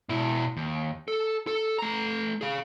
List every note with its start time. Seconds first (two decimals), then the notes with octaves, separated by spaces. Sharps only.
0.09 B2 E4
0.57 D#2
1.08 A4
1.47 A4
1.79 A3 A#5
2.41 G#4 F5